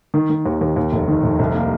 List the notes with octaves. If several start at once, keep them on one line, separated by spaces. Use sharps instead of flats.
D#3
D#3
D#2
D#2
D#2
F1
D#3
F1
C2
A#3